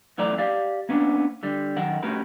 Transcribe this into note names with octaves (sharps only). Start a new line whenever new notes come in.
F#2 E3 A3 D5 A#5
G4 D5 F5
A#3 B3 C#4 D4
D3 G3
F#2 D#3 A#4 F#5
A3 C#4 F#4 G4 A#4 B4